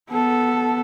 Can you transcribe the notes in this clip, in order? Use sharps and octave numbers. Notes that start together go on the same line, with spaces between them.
B3 A4